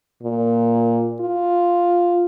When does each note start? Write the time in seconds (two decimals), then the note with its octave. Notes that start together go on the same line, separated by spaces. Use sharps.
0.23 A#2
1.21 F4